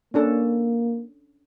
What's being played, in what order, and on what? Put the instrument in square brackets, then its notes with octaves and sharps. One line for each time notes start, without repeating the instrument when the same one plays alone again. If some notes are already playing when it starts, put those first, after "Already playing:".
[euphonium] A#3 [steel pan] C#4 D4 A4